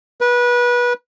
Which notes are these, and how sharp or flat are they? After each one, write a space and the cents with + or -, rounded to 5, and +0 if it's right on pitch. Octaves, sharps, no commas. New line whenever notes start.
B4 -25